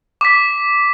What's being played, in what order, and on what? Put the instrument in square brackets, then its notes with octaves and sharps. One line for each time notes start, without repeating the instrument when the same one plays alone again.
[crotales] D6 B6